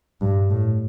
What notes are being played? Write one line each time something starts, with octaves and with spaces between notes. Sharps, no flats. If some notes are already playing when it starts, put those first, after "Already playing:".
G2
A2